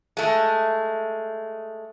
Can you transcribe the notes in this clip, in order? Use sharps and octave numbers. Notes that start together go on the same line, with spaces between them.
G#3 A3